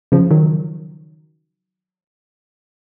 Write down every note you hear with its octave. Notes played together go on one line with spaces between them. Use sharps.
C#3 F3
D#3 F#3